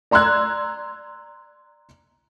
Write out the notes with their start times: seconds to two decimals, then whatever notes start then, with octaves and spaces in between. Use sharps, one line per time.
0.11 D5 A#5 C6 E6 F#6 G#6